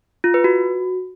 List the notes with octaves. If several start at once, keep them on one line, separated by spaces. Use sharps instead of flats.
F4
B4
F#4